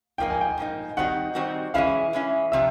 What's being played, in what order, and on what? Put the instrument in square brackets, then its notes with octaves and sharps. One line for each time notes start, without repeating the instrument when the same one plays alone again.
[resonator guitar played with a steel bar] G#2 F3 A#3 D#4 [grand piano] G5
[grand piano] G#5
G5
[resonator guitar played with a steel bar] G#2 F3 A#3 D#4
[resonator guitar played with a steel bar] D#3 G3 C4 D#4 F#4 [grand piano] F#5
[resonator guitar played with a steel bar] D#3 G3 C4 D#4 F#4
[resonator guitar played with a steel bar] E3 G#3 C#4 E4 [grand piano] F5
[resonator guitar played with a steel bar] E3 G#3 C#4 E4
[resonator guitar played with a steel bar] C3 F3 [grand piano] E5